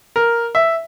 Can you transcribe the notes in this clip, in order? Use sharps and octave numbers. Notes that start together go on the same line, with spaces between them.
A#4
E5